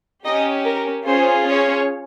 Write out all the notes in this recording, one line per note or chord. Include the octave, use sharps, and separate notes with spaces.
C#4 D#4 G4 D#5
A#4
C#4 F4 G#4 C5
C#4 C#5